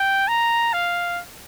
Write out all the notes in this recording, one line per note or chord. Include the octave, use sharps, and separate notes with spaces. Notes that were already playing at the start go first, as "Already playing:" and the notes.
Already playing: G5
A#5
F5